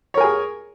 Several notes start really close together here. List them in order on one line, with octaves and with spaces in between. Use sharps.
C#5 A#4 G#5 G#4